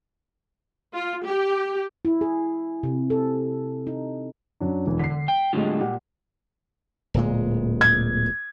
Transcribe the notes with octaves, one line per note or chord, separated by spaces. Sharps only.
F4
G4
E4
G#4
C3
A4
D#4
F#2 F#3 D4
E1 E3
D3 B6 C7
G5
A2 D3 G3 G#3 F4
A#2 G4 F#5
D1 A#2 G#3
G#6